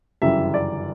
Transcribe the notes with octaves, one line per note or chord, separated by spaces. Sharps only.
G1 F#2 C#3 E3 G3 E5
D5